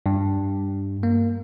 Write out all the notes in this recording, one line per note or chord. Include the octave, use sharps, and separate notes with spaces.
G2
A#3